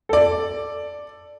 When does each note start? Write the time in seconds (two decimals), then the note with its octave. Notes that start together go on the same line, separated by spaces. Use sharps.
0.09 A4 D5